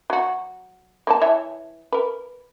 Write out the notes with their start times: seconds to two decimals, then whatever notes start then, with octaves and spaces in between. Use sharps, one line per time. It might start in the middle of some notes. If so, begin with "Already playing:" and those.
0.10 F#3 F#4
1.07 A#3 B4 A5
1.21 E3 C#5 E5
1.92 A#4 B4